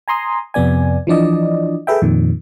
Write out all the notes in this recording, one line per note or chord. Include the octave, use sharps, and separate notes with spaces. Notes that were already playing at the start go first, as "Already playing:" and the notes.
G#5 A#5 C6 D#6
F2 C3 B3 D5 G#5
E3 F3 D4 D5 D#5
G#4 A4 B4 E5 G5
F2 A#2 D#3